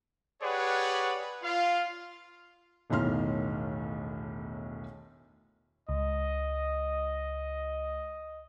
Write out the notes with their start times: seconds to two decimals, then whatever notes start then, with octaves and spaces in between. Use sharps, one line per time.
0.42 G4 G#4 B4 C#5 D5 F#5
1.42 F4 F5
2.90 E1 B1 A2 D#3 C6 F6
5.89 C#2 D#5